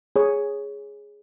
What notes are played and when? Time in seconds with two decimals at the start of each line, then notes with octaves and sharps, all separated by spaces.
0.16 G#4 C#5